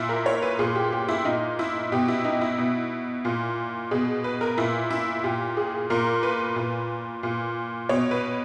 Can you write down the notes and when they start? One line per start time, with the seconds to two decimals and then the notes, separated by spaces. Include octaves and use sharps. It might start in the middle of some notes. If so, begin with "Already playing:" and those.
Already playing: A#2 E4
0.09 A#4
0.26 C#5
0.42 B4
0.59 A#2 G#4
0.75 G4
0.92 G4
1.09 E4
1.25 A#2 D#4
1.59 E4
1.92 B2 G4
2.08 E4
2.25 D#4
2.41 E4
2.58 B2
3.25 A#2
3.91 B2 G#4
4.24 B4
4.41 A#4
4.58 A#2 E4
4.91 E4
5.24 A#2 G4
5.57 G#4
5.90 A#2 A#4
6.23 B4
6.56 A#2
7.23 A#2
7.89 B2 C#5
8.11 B4